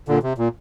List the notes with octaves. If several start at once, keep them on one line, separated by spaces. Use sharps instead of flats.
A#2 D3
C3
A#2